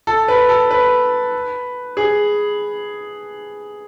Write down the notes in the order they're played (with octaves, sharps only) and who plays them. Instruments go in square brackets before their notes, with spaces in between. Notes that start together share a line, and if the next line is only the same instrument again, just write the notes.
[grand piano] A4
B4
A4
B4
G#4